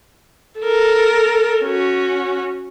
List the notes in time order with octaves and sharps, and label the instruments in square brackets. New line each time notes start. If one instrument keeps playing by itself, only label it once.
[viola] A4 A#4
C#4 F#4